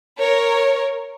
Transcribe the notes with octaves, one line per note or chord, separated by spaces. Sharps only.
A#4 C#5